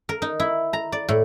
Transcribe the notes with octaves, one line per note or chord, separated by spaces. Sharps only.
A#4
D#4
E4
A#5
D5
A2